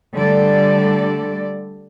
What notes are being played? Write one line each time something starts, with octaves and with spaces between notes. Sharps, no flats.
D3 G3 A3 A4 D5